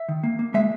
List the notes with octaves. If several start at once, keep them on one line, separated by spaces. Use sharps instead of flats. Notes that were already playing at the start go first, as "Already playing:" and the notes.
Already playing: E5
D#3
A#3
A#3
G#3 E5